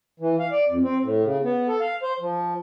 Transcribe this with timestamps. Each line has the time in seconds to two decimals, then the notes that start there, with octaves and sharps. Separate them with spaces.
0.20 E3
0.39 F5
0.51 D5
0.68 F2
0.83 C4
1.02 A2
1.24 C#3
1.43 B3
1.68 A4
1.81 F5
2.03 C5
2.20 F3